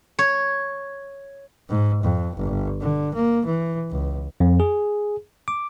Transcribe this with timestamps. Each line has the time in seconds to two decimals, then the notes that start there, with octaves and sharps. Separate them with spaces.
0.19 C#5
1.69 G#2
2.04 F2
2.37 G1
2.81 D3
3.14 A#3
3.46 E3
3.91 C#2
4.40 F2
4.60 G#4
5.48 D6